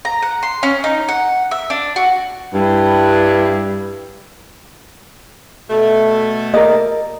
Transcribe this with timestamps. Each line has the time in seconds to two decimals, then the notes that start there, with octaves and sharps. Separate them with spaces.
0.05 A#5
0.22 F#5
0.43 C6
0.63 C#4
0.84 D#4
1.09 F#5
1.51 E5
1.70 D4
1.96 F#4
2.54 G2 E4
5.70 B2 A3
6.54 A#4 D5 D#5